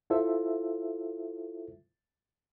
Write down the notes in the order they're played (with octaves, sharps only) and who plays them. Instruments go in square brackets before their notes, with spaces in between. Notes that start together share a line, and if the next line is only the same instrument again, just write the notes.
[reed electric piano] E4 F4 A4 C5 E5